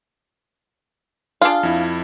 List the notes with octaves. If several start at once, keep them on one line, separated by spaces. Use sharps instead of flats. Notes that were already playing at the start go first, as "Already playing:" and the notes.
D4 F4 G#4 F5
F2 E4